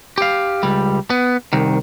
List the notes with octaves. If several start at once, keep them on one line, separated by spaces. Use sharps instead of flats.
G4 F5
C#2 G3
B3
C2 D#3